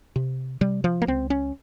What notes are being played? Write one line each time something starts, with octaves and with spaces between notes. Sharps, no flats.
C3
C3 G3
F3
A#3
C#2 C4
C#4